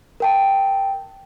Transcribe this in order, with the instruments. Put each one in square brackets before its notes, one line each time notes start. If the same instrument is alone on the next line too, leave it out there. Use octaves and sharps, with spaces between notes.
[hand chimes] A#4 G5 A5